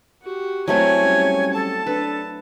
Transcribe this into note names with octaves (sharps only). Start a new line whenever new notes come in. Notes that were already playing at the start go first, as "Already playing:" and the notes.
F#4 G4
F#3 A3 C4 E4 C#5 G#5
G3 C#4
A4 A5
D4 A4 B4